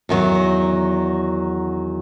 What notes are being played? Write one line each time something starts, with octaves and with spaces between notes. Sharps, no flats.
E2 D#3 F3 F#3